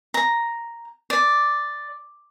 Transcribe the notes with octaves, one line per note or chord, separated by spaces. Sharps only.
A#5
D5